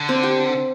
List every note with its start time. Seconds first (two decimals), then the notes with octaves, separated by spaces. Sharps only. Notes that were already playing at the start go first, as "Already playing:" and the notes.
Already playing: D3
0.09 C4
0.23 G4